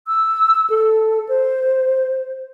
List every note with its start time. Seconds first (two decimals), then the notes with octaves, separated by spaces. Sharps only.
0.07 E6
0.70 A4
1.29 C5